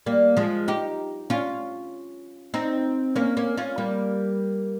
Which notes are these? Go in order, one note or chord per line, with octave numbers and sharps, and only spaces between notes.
G3 A#3
F3 G#3
D#4 G4
C#4 F4
C4 D#4
A#3 C#4
A#3 C#4
C#4 F4
G3 A#3